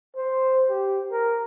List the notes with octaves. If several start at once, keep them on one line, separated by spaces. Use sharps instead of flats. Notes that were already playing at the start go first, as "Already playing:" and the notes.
C5
G4
A#4